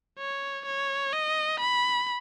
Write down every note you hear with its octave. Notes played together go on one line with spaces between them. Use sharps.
C#5
C#5
D#5
B5